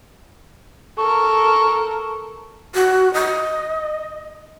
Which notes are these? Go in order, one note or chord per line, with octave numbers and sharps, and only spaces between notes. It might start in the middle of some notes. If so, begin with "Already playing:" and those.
A4 A#4 C#6
F#4
D#5